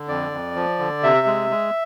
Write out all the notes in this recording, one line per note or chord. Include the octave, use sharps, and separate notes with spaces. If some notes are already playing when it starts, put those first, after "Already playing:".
Already playing: D3
F2 D5
F2
F3
D3
C3 E5
G#3
G#3